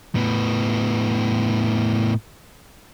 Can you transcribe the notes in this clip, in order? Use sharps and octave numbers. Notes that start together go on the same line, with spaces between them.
A2 B3